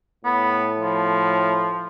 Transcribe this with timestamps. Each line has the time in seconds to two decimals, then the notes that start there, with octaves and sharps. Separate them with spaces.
0.25 A2 B3
0.81 F3